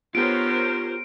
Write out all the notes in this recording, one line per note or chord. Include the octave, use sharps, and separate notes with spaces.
B3 F4 G4 A#4 C5 C#5 D7